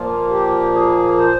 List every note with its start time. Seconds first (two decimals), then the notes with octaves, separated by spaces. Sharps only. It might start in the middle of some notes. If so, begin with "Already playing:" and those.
Already playing: A#2 F3 A#3 F4
0.30 G4
0.74 G#4
1.18 C5